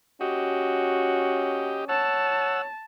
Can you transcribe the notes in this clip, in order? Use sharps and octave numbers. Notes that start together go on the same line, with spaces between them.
C#4 F#4 G4 D#5
C#5 F#5 A5 E6